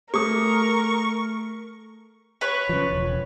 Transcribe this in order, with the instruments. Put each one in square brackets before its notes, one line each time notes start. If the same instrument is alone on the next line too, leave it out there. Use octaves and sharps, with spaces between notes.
[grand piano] A3 [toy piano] G#4 D#6 [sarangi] A#4 [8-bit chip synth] C#6
[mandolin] B4 C#5
[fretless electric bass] C#3 F3
E1